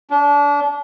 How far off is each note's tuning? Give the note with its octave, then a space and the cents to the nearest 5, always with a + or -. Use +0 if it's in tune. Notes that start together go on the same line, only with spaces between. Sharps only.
D4 -30